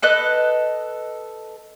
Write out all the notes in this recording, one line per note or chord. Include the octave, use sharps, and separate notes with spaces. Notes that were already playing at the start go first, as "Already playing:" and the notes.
A4 B4 D#5 F#6